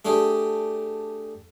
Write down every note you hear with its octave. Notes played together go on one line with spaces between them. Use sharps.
A3 D4 G4 G#4